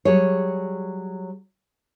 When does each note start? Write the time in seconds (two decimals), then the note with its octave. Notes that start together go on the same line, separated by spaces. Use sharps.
0.05 F#3 G3 G#4 C#5